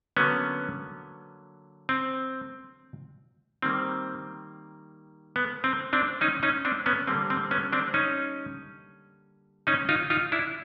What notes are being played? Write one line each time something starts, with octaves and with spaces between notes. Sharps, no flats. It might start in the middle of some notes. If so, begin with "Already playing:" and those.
D3 F#3 A#3 B3 C#4
C4
D#3 G3 A#3 C4
B3
C4
C4 D4
C#4 D#4
C#4 D#4
C4 D4
B3 C#4
D3 G3 A#3 C4
C4
B3 C#4
C4 D4
C#4 D#4
C#4 D#4
D#4 F4
D#4 F4
D4 E4